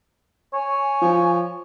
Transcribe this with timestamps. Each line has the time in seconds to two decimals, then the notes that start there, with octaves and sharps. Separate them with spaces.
0.53 C#5 G#5
1.02 F3